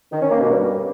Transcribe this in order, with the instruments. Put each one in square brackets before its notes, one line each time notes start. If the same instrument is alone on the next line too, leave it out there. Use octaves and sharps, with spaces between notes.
[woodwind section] D#3
C#4
A#3
B2
G2